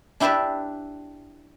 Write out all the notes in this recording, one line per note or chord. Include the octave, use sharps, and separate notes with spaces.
D4 E4 G4 B4 D5 E5